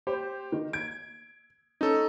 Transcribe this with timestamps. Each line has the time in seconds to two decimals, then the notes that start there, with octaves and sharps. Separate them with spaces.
0.07 G4 C5
0.52 D#3
0.73 G#6 D7
1.81 C#4 D#4 A4